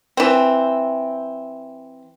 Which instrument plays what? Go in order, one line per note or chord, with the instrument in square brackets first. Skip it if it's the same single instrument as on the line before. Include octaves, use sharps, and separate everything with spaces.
[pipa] E3 C4